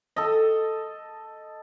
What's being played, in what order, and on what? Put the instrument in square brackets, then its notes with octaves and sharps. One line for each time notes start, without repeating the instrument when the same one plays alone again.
[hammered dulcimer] A4 D#5